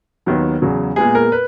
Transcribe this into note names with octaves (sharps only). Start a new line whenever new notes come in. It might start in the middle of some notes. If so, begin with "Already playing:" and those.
D#2 D#3 F#3 B3
E2 C#3 F#3
A#2 G#3 B3 G#4
A#4
B4